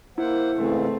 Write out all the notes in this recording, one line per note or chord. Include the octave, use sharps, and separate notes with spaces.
A#3 E4 C5 F#5
G#2 C#3 E3 A3 C4